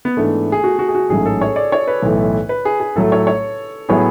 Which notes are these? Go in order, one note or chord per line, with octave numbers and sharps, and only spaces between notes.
B3
G#2 E3 A3 B3 D4
G#4
F#4
F#4
G#4
F#4
A1 G#2 F#3 A3 G#4
A4
C#5
D5
C#5
B4
B1 A2 E3 A3
B4
G#4
G#4
A2 F#3 A3 A4
C#5
C#5
A2 F#3 B3 E4 G#4 C#5